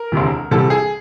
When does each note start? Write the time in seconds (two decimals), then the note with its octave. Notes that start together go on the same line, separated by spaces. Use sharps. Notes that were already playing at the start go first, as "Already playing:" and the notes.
Already playing: A#4
0.12 E1 D2 C3 E3
0.51 C2 C3 E3 G3 A4
0.70 G#4